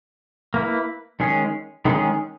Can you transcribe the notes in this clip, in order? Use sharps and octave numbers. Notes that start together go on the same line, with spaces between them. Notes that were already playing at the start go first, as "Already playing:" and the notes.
A#3 E4 B4
D#3 G#3 C#4 G#4
D#3 G#3 C#4 G#4